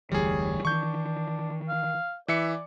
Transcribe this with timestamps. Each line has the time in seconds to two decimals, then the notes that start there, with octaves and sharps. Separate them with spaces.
0.12 F1 D2 E3 G3 G#4 C#5
0.65 D#3 E3 D4 C#6 G6
1.69 F5
2.28 E3 D5 E5 C#7